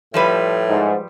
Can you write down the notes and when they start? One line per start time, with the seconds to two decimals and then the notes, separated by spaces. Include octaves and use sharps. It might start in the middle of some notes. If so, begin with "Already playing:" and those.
0.14 A2 F3 G3 B4
0.68 G#2